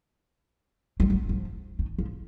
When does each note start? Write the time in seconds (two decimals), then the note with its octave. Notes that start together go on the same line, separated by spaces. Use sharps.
1.00 F#3
1.10 F#3
1.29 F3
1.79 D#3
1.98 F3